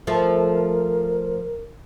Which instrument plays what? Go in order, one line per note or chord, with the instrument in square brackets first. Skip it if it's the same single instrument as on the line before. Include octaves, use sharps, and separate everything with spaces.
[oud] F3 A3 [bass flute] A#4